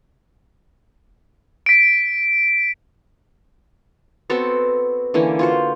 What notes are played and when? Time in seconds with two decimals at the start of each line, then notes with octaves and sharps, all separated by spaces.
1.66 B6 D7
4.30 B3 C4 F#4 A4
5.14 D3 E3 A#3 C#4
5.39 F4 F#4 C5